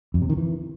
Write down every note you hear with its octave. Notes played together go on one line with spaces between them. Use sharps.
F2
C3
D#3
E3